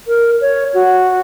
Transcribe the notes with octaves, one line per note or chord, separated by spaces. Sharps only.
A#4
C#5
F#4